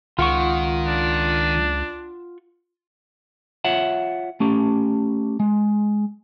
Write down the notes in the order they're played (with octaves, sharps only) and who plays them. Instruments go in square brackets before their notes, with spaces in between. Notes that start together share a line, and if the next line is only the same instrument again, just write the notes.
[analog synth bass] C#2 [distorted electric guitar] D#3 [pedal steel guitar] F4 F#5 C#6
[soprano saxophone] D4
[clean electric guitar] F4 C#5 E5 F#5
A3 C#4 G4
G#3